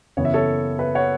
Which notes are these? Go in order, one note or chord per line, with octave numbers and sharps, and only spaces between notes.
F#2 C#3 E3 B3 C#5
E5
A4 C#5
B4 E5
C#5 F#5